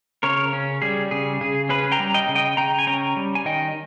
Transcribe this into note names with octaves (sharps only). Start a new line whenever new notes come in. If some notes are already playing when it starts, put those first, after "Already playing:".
C#3 A#4 C#5
C#4
G3 G#4
C#3 G#4
C#3 G#4
C#4 G#4 B4
G5 A#5
G3
D#5 G5
C#3
D#5 G5
C#3 G5 A#5
G#5
C#4 G5 A#5
G3
G#5
D#3 D#5 G5